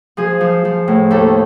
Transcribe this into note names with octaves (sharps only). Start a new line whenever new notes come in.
F3 G#4
F3
F3
A2
D#2 A4